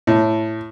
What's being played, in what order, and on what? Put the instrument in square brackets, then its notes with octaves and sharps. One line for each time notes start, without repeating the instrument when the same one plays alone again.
[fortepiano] A2